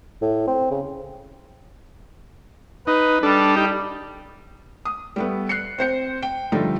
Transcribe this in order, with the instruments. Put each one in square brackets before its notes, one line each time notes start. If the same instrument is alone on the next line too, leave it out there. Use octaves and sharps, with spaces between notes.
[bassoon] A2
C4
C#3
[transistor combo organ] D#4 [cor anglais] B4
[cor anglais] G3 [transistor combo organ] D4 A4
[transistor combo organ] D#4 G4
[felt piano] D#6
G3 A3 B3
F#6 C7 C#7
C4 C5 C#7
G5
D3 F3 G3 A3 D#4